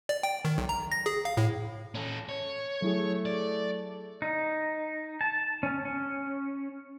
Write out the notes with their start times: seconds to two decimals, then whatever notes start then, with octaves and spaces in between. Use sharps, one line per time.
0.09 D5
0.23 G5
0.45 D#3
0.58 B1
0.69 A#5
0.92 A#6
1.06 G#4
1.25 F5
1.37 A2
1.95 C#4 A4
2.29 C#5
2.82 F#3 A3 E4 G#4
3.25 D5
4.22 D#4
5.21 A5
5.63 C#4
5.85 C#4